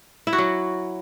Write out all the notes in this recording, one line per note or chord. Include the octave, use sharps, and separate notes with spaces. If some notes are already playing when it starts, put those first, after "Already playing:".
E4
F#4
F#3